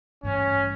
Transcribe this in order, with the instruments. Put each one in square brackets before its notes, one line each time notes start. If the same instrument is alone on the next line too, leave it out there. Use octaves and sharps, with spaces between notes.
[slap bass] A1 G2 E3 G3 [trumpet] C#4